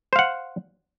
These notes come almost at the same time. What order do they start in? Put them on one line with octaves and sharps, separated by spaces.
C5 F5 F#5